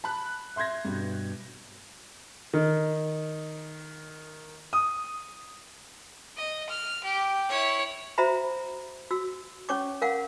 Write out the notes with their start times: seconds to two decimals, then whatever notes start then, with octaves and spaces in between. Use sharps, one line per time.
0.04 A5 B5 F#6
0.56 E5 C6 G6 G#6 A#6
0.85 G2 B2
2.54 D#3
4.73 D#6
6.37 D#5
6.69 F6
7.04 G4
7.50 E4 C#5
8.18 F#4 C5 E5 A#5 B5
9.11 F#4 E6
9.69 C#4 C#5 C#6 D6
10.02 A#4 F5 F#5